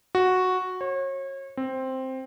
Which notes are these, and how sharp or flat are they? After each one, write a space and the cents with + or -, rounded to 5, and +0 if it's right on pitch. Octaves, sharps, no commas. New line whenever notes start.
F#4 -5
C#5 -35
C4 +5